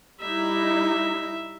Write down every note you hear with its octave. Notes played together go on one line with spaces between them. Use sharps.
G3 D#4 E4 E5